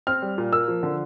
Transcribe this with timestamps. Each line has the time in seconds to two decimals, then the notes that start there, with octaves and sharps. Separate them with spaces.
0.07 C4 F6
0.22 G3
0.38 A#2
0.52 A#3 E6
0.68 F3
0.83 D3